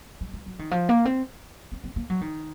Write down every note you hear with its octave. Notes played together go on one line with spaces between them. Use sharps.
G#3
G#3
F#3
D#3
F3
A#3
C4
C4
C4
A#3
F#3
D#3